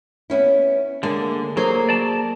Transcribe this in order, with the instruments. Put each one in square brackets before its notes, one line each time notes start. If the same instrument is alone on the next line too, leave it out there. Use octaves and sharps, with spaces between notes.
[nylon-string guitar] B3 C#4 E4
[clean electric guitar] D3 [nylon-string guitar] G#3 A#3
[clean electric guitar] F#3 [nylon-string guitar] A#3 G#4 C5
[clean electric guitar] D5 A5